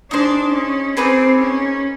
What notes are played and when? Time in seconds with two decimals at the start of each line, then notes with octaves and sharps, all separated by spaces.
0.11 D4 D#4 G#4 C5
0.53 C#4
0.97 A#3 C4 D#4 G#4 B4
1.39 C#4